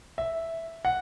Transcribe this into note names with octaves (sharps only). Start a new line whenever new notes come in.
E5
F#5